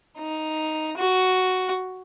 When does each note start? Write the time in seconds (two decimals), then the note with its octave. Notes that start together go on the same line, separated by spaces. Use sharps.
0.18 D#4
0.98 F#4